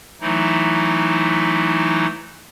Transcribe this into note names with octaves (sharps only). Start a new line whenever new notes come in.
E3 F#3 A3 D#4 E4